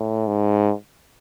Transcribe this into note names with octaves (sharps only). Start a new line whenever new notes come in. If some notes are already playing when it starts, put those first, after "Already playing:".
Already playing: A2
G#2